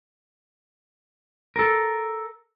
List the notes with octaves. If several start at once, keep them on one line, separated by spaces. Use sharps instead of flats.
A4 A#4